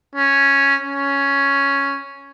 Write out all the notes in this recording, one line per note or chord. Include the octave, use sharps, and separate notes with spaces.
C#4
C#4